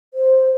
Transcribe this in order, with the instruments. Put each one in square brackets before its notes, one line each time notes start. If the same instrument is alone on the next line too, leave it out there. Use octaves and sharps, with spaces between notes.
[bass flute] C5